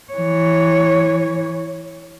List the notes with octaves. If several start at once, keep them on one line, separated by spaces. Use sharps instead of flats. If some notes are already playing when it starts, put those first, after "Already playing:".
E3 C#5